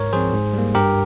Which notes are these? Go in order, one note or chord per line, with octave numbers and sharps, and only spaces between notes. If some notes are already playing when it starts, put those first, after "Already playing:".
Already playing: G#2 A#4 C#5
F3 C4 G#4 C5
G#2
G3 A#3
G2 G4 A#4